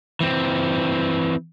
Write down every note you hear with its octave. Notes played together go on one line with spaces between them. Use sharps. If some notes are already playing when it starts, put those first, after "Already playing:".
E3 C4